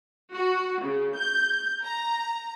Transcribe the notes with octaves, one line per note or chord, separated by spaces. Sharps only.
F#4
C#3
G6
A#5